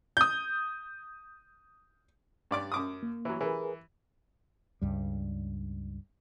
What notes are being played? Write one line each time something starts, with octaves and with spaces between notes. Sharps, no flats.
D#6 G6
G2 D5 D6
F#2 D6 D#6
A#3
E3 F#3
E3 G#4 A#4 B4
C#2 G2 G3